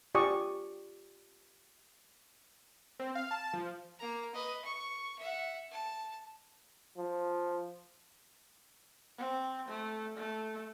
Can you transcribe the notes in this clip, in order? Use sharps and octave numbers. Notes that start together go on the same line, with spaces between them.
F4 G4 D5 G#5 C#6 D#6
C4
F5
A5
F3
A#3 A#5
B4 D#5
C#6
E5 F#5
A5
F3
C4
A3
A3